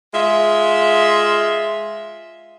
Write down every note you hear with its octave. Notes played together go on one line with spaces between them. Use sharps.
G#3 F4 E5